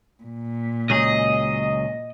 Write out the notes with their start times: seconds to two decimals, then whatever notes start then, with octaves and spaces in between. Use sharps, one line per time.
0.23 A#2
0.90 C#2 F#3 G#4 D#5